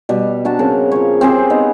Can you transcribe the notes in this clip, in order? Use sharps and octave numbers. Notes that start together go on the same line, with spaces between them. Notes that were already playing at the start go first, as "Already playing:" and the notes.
B2 G3
D4 F#4 A5 A#5
C#3 C4 A#4
F3 C#5
C4 G4 G#4 C5
B3 D#4 D#5